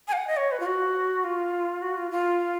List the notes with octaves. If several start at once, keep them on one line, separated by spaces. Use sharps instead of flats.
G#5
F5
F#5
D#5
C#5
B4
F4
F#4
F4
F#4
F4
F4